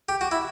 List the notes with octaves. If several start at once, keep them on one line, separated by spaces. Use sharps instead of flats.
G4
F#4
E4